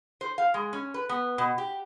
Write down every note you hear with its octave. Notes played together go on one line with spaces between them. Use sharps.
C5
F5
G#3
C#4
B4
B3
B2
G4